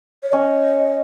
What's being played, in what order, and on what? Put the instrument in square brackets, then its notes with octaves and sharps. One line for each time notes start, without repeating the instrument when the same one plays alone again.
[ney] C#5
[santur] C#4 [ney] D#5